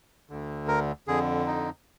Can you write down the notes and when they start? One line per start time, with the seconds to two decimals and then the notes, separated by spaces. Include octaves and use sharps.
0.30 D2 D3
0.68 A#4
1.08 F2 D3 G#4
1.47 D#4